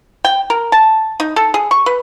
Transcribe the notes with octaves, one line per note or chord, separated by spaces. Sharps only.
G5
A#4
A5
D#4
A4
G#4
C#6
B4